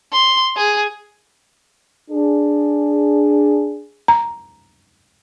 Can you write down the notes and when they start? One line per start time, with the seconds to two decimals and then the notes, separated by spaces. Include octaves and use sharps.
0.13 C6
0.57 G#4
2.11 D4 G#4
4.08 A#5